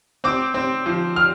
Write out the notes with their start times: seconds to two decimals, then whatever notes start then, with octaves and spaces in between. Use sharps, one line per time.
0.24 C4 D6
0.54 C4
0.86 F3
1.16 F6